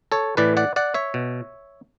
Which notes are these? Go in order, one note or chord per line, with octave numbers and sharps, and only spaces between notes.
A4 C#5
A2 E3 B4 D5
D5 F#5
D5 F#5
C#5 E5
B2